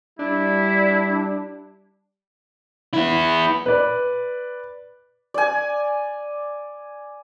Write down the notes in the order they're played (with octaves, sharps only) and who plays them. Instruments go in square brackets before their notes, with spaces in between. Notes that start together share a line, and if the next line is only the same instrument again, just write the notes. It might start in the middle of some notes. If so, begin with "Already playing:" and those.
[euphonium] G3 [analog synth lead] D4 [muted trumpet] E4
[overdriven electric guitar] B3 E4
[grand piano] B4 D5
[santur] D5 G#5